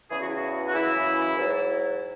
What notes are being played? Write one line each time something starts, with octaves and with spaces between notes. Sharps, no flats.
E2 C#3 E3 G#4
F#4
E4
F#4
F#4
F#2 C#3 E3 E4
G#2 F#3